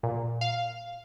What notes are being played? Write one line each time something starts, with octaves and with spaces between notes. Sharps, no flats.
A#2
F5